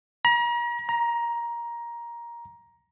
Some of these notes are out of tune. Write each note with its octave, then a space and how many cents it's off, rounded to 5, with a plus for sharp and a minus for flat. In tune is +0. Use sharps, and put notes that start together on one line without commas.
A#5 +40
A#5 +15